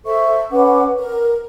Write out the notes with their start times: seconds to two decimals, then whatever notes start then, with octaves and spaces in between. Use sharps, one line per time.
0.05 A4 C5 E5 C#6
0.51 C#4 B4 F#5 D6
0.99 A#4